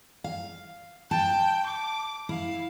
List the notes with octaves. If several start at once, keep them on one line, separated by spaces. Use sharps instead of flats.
F5
G5 A5
D6
E4 F5